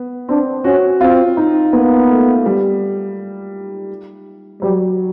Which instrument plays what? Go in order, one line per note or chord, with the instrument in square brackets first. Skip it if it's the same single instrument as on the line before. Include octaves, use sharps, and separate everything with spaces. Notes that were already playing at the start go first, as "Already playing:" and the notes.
Already playing: [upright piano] B3
[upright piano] C4 [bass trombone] D4
[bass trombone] C#4 [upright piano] F#4
[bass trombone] C4 [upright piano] F4
[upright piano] D#4
[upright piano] A#3 [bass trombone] B3
[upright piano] A3
G3
[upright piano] F#3 [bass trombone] G3